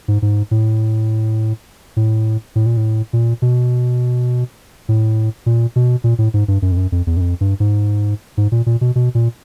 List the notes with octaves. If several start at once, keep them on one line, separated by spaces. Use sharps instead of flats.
G#2
G#2
A2
A2
A2
A#2
A2
A#2
B2
A2
A#2
B2
A#2
A2
G#2
G2
F#2
F2
F#2
F2
E2
F#2
F2
G2
G#2
G#2
A#2
A#2
B2
B2
A#2